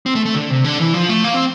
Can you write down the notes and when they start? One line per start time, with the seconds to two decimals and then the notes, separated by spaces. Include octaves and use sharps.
0.06 C4
0.15 A3
0.25 A3
0.35 D3
0.50 C3
0.64 D3
0.79 E3
0.94 F3
1.09 A3
1.24 A#3
1.34 C4